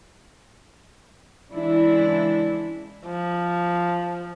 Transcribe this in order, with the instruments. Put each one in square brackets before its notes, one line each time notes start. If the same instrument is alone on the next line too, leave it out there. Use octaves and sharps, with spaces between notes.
[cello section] C#3 E3 G#3 D4 E4
[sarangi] F3